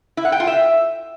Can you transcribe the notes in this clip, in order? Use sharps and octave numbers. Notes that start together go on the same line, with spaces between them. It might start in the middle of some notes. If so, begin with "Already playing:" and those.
E4
F#5
G5
F4
E5